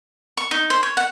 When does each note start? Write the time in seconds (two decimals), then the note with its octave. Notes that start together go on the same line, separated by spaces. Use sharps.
0.37 C#6
0.51 D#4
0.70 C5
0.83 C#5
0.97 F#5